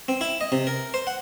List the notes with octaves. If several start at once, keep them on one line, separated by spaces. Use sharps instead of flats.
C4
E4
D#5
C3
A#4
C5
F#5